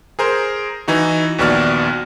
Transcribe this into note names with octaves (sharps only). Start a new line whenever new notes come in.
G#4 A#4 C5
E3 D#4 F#4
A#1 D#2 B3 F#4 D5 F6